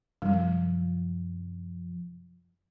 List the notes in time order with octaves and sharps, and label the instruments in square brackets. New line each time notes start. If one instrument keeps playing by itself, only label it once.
[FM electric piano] F#2 C3 F3 [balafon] G3